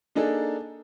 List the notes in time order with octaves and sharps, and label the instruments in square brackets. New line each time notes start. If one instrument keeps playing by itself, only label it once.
[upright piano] A#3 D4 D#4 G#4 A4